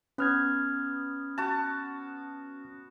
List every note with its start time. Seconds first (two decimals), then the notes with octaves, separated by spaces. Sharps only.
0.18 B3 C#4 F6 G#6
1.38 F#4 A5